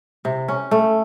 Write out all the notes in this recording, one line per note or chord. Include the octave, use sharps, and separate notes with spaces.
C3
C#4
A3